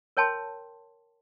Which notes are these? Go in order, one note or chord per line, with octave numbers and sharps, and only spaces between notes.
A#4 C#5 G5 A5 C6